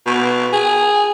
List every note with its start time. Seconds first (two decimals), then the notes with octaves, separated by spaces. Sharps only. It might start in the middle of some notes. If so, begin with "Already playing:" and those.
0.06 B2
0.53 G#4